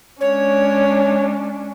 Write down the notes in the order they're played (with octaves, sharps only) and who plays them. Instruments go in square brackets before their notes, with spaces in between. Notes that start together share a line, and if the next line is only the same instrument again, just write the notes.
[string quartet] G#3 C#4 D4 [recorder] C#5